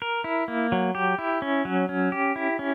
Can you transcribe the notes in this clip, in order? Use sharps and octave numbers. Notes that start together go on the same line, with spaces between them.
A#4
E4
A#3
F#3
G4
E4
C#4
F#3
C#4
G4
E4
C#4